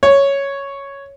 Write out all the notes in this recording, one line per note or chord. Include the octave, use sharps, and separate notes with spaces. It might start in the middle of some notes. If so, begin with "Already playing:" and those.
C#5